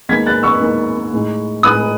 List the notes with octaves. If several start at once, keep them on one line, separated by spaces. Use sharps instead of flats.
D#2 D#3 G#3 B3 D#4 G#6 B6
F#6 A6
C#6 E6
D#2 D#3 G#3 B3 D#4
A2 G#3 D#4
A2 G#3 D#4 D#6 F#6